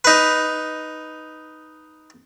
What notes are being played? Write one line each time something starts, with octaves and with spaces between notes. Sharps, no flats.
D#4 B4